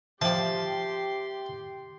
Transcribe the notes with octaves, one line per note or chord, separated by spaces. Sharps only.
F3 G4 D5 E5 G5 A5 C6